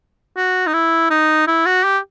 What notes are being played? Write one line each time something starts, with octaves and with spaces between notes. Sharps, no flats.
F#4
D#4
E4
D#4
E4
F#4
G4